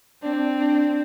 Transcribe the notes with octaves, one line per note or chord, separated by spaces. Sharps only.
C4 D4
D4